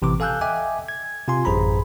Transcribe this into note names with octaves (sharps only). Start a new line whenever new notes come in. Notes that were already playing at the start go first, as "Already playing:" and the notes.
A1 C3 E3 D6
A4 F5 G#5 E6 F#6 G6
D#5 E5 G5 G#5 D6
G#6
C3 F4 G#5 C6
A1 F#2 G#4 C5 A#5 B5